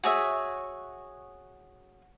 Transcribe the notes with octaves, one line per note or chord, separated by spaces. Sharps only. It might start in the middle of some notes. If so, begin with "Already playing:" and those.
F#4 G#4 C#5 E5